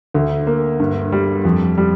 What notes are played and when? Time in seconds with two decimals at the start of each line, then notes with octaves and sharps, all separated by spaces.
0.14 D2
0.47 A#3
0.80 G2
1.12 G3
1.45 F2
1.78 G3